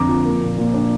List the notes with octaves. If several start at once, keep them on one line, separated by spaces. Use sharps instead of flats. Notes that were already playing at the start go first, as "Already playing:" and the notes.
Already playing: F2 D3 C4 A#5 D6
F3
A#3
A#2
A#2
D4